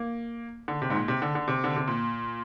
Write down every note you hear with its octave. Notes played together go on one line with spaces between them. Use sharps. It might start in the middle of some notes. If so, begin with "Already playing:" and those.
Already playing: A#3
D3
C3
G#2
A#2
C3
D3
D3
C3
D3
C3
A#2